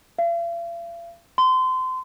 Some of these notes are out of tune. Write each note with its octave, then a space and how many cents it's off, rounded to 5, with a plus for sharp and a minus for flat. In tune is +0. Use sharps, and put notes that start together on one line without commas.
F5 -45
C6 -30